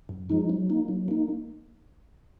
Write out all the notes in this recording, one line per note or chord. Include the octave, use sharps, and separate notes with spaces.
F#2
F3 G#3 D#4
F#3
A#3 D#4
F#3
A#3 D#4